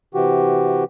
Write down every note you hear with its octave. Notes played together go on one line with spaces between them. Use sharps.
C3 E3 F#4 G4